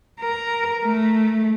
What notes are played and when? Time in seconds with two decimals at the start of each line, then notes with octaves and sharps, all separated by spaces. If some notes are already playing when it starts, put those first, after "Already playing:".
0.21 A#4
0.83 A3